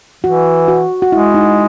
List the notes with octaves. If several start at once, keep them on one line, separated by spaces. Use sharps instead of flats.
E3 F#4
F#4
F#4
G#3 E4
D#4